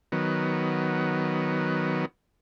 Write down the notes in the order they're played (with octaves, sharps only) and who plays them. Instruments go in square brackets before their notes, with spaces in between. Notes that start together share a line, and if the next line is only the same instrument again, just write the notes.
[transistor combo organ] D#3 F#3 B3